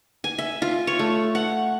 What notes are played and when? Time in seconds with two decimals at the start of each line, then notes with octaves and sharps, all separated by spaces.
0.24 G#5
0.38 E5
0.62 F4
0.87 C#5
0.99 A3
1.35 F#5